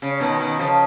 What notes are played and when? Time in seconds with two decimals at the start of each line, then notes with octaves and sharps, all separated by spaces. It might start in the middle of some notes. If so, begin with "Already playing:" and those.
0.02 C#3
0.20 B2 D#3
0.39 B2 D#3
0.59 C#3 F3